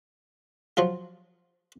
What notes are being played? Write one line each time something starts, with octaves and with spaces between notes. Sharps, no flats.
F3 F#3 F4